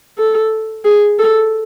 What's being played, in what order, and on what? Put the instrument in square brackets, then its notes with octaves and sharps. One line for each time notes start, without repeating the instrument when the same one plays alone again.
[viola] A4
G#4
A4